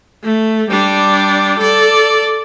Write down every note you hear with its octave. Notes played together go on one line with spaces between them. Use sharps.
A3
G3 D4
A4 D5